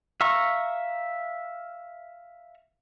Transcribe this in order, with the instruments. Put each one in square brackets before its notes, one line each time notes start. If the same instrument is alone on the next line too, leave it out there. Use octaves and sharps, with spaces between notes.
[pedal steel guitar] E5 F5 A#5 C#6